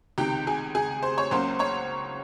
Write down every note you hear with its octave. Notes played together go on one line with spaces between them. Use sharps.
C#2 C3 D#3 G4 G5
G#4 G#5
G#4 G#5
C5 C6
C#5 C#6
C#2 C#3 F#3 A#3 C#4 C5 C6
C#5 C#6